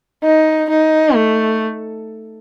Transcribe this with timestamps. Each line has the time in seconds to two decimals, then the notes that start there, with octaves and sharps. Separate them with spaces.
0.24 D#4
0.70 D#4
1.15 A3